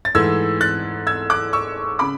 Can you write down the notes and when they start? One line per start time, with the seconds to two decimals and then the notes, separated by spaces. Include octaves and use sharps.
0.05 A6
0.15 G#2 E3 A3 E6 G#6
0.61 F#6 A6
1.07 E6 G#6
1.30 D6 F#6
1.53 C#6 E6
1.99 C#3 B5 D6